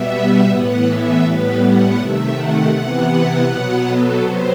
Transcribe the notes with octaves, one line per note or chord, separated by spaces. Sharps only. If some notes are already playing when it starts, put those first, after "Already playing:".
Already playing: B2 G3 B3 E5
A2 E3 B3 F#5
E5
A2 G3 B3 B4
F#5
C3 D#3 A3 E5
F#5
C3 E3 B3 F#5
B2 F#3 B3
A4
C3 F#3 B3 C5